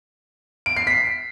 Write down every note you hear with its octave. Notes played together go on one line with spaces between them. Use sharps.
D7
C7
B6